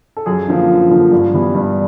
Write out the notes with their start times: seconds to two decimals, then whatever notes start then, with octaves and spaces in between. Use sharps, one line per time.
0.17 A4
0.26 F#2 G#4
0.48 D3 F3 A#3
0.70 F#2
0.90 D3 F3 A#3
1.11 G2
1.34 E3 G3 B3
1.55 G2